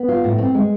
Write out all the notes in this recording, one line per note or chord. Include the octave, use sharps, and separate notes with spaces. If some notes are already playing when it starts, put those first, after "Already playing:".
Already playing: B3
F4
A2
C4
G#3